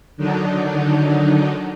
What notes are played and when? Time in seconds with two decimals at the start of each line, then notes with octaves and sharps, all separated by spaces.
0.17 D3 D#3 F#3 D4 D#4